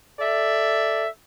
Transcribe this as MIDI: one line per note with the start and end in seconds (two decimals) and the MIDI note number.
0.20 1.07 69
0.20 1.07 74
0.20 1.07 76